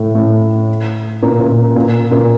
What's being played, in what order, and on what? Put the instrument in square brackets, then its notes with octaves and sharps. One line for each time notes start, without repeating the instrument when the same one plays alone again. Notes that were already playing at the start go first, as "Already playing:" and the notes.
Already playing: [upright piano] A2 A3
A2 A3
A#2 A#3
A#2 A#3
A#2 A#3
A#2 A#3